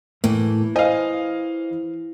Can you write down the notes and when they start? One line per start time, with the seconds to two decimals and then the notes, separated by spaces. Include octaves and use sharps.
0.24 A2 E3 A#3
0.76 C5 D#5 F5 G#5